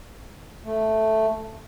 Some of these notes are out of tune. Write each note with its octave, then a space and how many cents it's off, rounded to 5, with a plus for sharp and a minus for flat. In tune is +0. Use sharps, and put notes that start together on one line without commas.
A3 +0